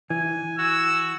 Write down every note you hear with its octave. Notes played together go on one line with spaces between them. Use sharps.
E3 G#5
F#4 E6